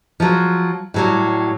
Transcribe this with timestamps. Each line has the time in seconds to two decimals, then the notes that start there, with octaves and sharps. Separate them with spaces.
0.20 F3 F#3
0.94 A2 F#3 G3